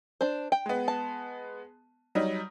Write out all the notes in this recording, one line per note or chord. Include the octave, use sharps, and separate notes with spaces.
D4 C5
G5
G#3 B3
A5
F#3 G3 D#4